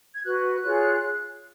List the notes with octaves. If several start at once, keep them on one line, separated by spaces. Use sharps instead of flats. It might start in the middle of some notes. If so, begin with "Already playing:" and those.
G#6
F#4 B4 F#6
F4 G#4 C#5